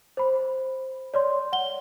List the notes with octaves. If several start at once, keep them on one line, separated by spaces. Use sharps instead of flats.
C5 B5
C#5 D5 C6
F#5 G7